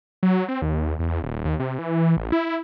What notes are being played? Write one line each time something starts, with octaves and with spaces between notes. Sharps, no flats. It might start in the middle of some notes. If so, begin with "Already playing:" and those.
F#3
C4
D#2
E2
D#1
D#2
C3
E3
A1
E4